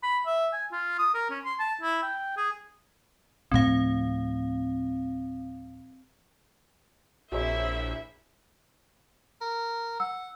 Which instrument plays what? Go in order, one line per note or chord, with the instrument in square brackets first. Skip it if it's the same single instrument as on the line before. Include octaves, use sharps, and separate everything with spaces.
[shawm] B5
E5
G#5
F4
D#6
A#4
C#4
C6
A5
E4
G5
G#4
[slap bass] D2 A2 F3 [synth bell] C4 F5
[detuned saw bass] A#1 [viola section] E4 C5 E5 [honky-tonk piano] F#4 G#4 C#5
[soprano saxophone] A#4
[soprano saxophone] F#5 [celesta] E6